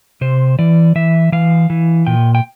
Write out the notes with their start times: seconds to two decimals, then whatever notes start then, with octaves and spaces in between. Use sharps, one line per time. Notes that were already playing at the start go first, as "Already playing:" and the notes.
0.21 C3 C5
0.59 E3 D5
0.95 E3 E5
1.32 E3 F5
1.70 E3
2.07 A#2 G5
2.35 G5